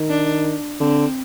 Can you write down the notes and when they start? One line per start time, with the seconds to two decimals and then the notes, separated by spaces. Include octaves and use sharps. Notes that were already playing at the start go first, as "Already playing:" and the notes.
Already playing: D#3
0.09 D4
0.80 D3 C4